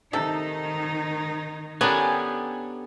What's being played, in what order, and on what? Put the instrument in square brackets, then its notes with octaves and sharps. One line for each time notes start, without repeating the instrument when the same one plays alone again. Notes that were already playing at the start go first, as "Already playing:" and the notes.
[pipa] C3 A4 [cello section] D#3 D#4
[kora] B3 D4 [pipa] C#4 A#4 [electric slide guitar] G4 A4 G#5